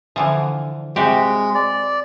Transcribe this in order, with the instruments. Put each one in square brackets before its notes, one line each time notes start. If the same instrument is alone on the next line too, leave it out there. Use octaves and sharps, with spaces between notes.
[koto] D3 E3 F3
[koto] C3 F#4 G4 [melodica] G#3
[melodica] D5